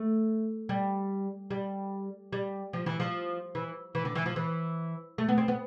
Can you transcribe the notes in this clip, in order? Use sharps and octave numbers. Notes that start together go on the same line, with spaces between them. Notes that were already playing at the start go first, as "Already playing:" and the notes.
Already playing: A3
G3
G3
G3
F3
E3
F3
E3
E3
D3
E3
F3
E3
A3
B3
C4
B3